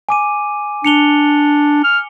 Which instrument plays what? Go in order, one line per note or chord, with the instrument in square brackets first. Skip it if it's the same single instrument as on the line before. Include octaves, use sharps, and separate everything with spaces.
[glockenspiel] G#5 D6 D#7
[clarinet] D4 [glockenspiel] C#7 F7 G7
[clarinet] F6